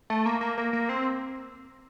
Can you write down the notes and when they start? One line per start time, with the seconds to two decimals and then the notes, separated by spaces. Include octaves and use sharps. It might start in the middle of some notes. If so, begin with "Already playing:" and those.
0.10 A3
0.26 A#3
0.41 A#3
0.58 A#3
0.73 A#3
0.89 C4